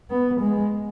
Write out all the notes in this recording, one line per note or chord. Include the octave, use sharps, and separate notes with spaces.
B3
G#3